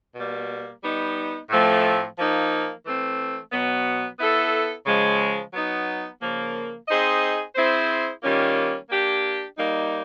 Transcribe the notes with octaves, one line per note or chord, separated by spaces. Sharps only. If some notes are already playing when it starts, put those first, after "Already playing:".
B2 G3 A#3
G3 B3 D#4
A2 F3 A3 C4
F3 A#3 D#4
E3 A3 C4
B2 F#3 B3
B3 E4 A4
C#3 F3 G#3
F#3 B3 D#4
C#3 F3 A#3
C4 D#4 G#4 C5 D#5
C4 E4 G#4 C5
D#3 G3 A#3 C#4 F4
A#3 D4 G4
G3 A#3 D#4